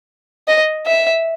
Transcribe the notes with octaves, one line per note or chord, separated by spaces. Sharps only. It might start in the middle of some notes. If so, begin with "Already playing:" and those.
D#5
E5